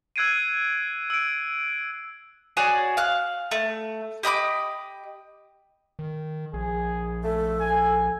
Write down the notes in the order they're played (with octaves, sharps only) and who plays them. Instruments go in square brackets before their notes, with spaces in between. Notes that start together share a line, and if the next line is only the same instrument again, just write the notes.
[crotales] E6 F#6 G#6 C7 D7 D#7
E6 D7
[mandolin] F#4 G#4 C#5 D5
F5 F#6
A3
G4 D#5 B5 D6
[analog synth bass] D#3
[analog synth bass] A#1 [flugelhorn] G#4
[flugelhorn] A3 [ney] A4
[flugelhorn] G#5